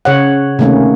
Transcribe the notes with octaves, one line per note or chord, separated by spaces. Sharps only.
C#3 C#5 F#5
C3 D#3 A3 A#3 C#4